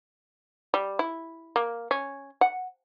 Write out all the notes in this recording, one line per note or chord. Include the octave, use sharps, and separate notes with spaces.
G3
E4
A#3
C#4
F#5